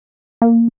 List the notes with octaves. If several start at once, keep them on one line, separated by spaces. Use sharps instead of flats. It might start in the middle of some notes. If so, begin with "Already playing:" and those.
A#3